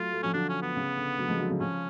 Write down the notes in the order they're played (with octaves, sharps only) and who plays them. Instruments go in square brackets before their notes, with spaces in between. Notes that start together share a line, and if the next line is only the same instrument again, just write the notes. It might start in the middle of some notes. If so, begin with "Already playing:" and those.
Already playing: [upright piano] F#3 A3 [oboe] F4
[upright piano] F#3 A3
[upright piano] F3 [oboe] C#4
[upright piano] D3 F#3 [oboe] D4
[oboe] C#4
B3
[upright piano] C#3
D3
D3 F#3
F3 G#3
D3 F#3
C#3 F3
[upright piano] C#3 F3 [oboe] C#4